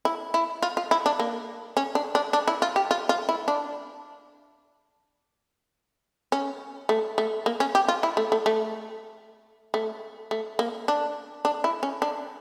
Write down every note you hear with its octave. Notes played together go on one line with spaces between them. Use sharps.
E4
E4
F4
F4
E4
D4
A#3
C#4
D4
D4
D4
E4
F4
G4
F4
F4
E4
D4
C#4
A3
A3
A#3
C#4
G4
F4
E4
A3
A3
A3
A3
A3
A#3
D4
D4
E4
C#4
D4